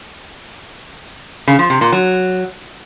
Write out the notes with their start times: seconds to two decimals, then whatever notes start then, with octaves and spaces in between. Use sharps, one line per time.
1.48 C#3
1.59 F3
1.70 C3
1.81 A#2
1.92 F#3